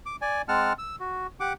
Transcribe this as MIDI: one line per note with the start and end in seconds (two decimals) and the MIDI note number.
0.06 0.16 86
0.21 0.42 74
0.21 0.42 80
0.48 0.73 56
0.48 0.73 60
0.48 0.73 78
0.48 0.73 81
0.48 0.73 89
0.79 0.96 88
1.00 1.27 66
1.40 1.53 67
1.40 1.53 78
1.40 1.53 86